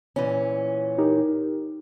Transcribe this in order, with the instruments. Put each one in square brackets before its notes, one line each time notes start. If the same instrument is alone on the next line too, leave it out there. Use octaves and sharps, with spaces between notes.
[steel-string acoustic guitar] A#2 E3 C#4
[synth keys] D#4 G4 A#4